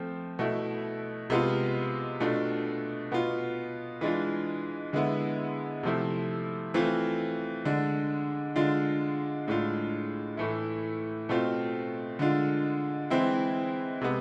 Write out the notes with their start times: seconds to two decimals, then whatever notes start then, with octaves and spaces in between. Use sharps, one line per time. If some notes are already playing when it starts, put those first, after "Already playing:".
Already playing: F3 A3 C4
0.39 B2 A3 E4
1.30 C3 G#3 B3 F4
2.20 B2 A3 D4 F4
3.12 B2 B3 F4
4.01 E3 G#3 D4 F4
4.93 D3 G#3 B3 E4
5.83 C3 F3 A3 E4
6.74 E3 A3 C4 F4
7.65 D3 G#3 D4
8.56 D3 G#3 D4 F4
9.48 A2 G#3 D4 F4
10.37 A2 E3 A3 E4
11.29 B2 A3 C4 F4
12.19 D3 G#3 D4 F4
13.10 E3 G#3 C4 E4
14.01 C3 G#3 B3